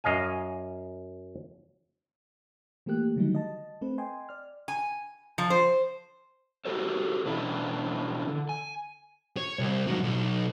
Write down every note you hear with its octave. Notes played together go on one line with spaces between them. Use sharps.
F#2 D#5 F5 G#5
E3 A3 A#3 G4 F#6
D3 D#3 F#3 G3 A3 D#4
D#5 A5
A3 C4 B4
D#5 G5 G#5 C6
D5 F6
G#5
F3
C5
F#4 G4 A4 B4 C#5
B2 E3 C#4 D4 E4 B4
D3
G#5
C#5
C2
G#2 F#3
B1